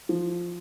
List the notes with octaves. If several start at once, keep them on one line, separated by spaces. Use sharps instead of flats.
F3